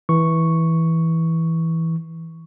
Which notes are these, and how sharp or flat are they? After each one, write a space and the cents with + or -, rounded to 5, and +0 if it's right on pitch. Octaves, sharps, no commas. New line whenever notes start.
E3 -15 C#6 +0